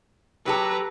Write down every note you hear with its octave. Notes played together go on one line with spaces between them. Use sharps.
F#3 G4 A4 B4 A#5